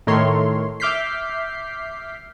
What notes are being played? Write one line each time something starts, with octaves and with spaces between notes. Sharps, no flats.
A2 D#3 A3 A#4 C#5 C6
E5 D6 F6 G6 B6 C7